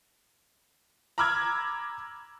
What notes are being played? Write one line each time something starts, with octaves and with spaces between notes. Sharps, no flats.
A#5 B5 D6 E6 F6 G#6